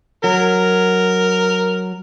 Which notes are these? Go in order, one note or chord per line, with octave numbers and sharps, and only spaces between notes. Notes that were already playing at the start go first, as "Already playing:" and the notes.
F#3 A#4